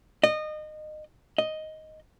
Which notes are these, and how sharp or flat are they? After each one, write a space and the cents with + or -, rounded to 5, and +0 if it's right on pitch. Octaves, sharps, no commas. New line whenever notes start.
D#5 -25
D#5 +5